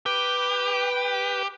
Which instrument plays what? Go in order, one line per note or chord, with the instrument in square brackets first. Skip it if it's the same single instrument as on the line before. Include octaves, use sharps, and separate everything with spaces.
[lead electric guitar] G4 [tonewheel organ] B4 G5